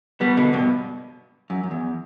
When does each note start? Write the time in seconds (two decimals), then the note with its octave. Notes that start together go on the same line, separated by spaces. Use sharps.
0.21 G3 B3
0.37 B2 D3
0.53 G2 B2
1.50 F#2
1.63 F#2
1.71 E2